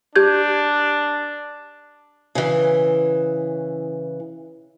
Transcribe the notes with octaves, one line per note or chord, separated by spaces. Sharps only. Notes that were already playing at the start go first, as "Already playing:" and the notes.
D4 G4 G6 G#6
C#3 E3